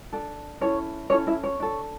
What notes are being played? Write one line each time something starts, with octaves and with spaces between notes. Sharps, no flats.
D4 A4
C#4 E4 A4 C#5
C#4 E4 A4 C#5
E4 E5
C#5
D4 A4